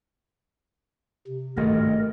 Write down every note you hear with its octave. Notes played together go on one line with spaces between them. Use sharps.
C3
G#1 G2 A#2 A3 A#4 D#5